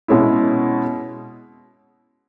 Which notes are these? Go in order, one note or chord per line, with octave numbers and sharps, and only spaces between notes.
B2 G#3 C#4 E4